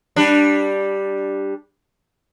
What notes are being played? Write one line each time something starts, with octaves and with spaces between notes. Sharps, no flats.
G3 D4